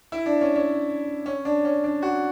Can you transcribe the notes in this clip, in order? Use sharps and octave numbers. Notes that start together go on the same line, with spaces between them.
E4
D4
C#4
C#4
C#4
D4
C#4
D4
F#4